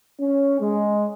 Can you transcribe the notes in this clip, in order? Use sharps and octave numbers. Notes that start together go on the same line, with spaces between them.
C#4
G#3